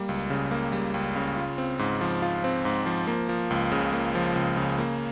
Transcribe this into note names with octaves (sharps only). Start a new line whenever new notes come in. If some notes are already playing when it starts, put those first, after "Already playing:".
Already playing: G3 A#3
C#2
C#3
A#3
G3
C#2
C#3
F4
C4
G#2
F3
F4
C4
G#2
F3
A#3
F3
C#2
C#3
A#3
F3
C#2
C#3
A#3